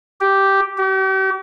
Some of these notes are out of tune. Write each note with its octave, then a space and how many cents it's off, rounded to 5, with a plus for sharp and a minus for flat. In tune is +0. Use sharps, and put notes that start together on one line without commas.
G4 -5
G4 -40